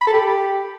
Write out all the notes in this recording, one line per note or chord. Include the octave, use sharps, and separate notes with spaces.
B5
A4
G4